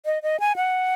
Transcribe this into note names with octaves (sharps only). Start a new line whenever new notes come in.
D#5
D#5
G#5
F#5